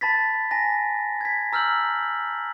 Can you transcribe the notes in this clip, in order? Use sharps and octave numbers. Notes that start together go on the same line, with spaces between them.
A5 B5 A6 B6
G#5 A5 A#6
G#6 B6
A#5 E6 F6 G6 F#7